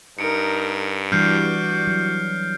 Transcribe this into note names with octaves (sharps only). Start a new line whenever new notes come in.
G2 D#4 A#4 C#7 D7
E3 G3 D4 F#4 D5 F6 G6 C7
F#3